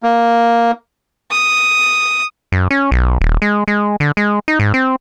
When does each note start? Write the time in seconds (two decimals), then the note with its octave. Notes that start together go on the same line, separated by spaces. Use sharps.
0.03 A#3
1.32 D#6
2.52 F#2
2.71 C#4
2.91 B1
3.21 D#1
3.42 G#3
3.68 G#3
4.00 D3
4.17 G#3
4.48 D#4
4.59 G#2
4.74 C4